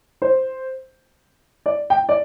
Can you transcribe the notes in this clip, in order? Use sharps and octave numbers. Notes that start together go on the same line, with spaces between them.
C5
D5
G5
D5